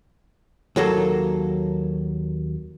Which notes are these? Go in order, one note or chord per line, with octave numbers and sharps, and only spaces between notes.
D#2 F#3 A#3 A4